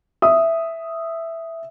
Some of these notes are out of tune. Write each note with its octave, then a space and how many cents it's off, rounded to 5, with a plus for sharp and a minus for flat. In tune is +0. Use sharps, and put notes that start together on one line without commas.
E5 +0 D#6 +0